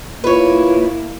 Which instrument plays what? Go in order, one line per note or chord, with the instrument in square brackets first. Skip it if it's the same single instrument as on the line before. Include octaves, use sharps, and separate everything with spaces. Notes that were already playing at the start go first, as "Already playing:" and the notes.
[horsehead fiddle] A#3 E4 [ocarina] F4 [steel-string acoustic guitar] B4 C#5